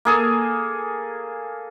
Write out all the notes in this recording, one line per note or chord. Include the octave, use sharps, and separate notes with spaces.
A#3 G#4 A4